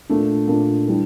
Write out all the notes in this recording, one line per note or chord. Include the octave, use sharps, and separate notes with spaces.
A#2 A3 D4
A#2 A3 D4
E3 G3 D4